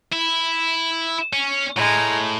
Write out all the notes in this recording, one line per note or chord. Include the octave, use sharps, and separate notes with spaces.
E4
C#4
A2 G#3 A#5